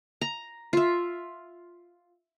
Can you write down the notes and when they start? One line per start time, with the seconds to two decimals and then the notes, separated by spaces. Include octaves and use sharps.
0.21 A#5
0.73 F4 E5